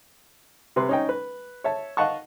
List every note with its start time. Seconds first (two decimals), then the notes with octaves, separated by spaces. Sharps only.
0.76 C3 B4 C6
0.89 C#4 D#4 G5
1.09 B4
1.64 C#5 E5 A5
1.97 D#5 F5 F#5 A5 C#6